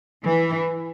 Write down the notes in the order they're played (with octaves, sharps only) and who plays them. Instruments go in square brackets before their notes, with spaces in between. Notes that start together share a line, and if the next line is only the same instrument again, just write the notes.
[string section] E3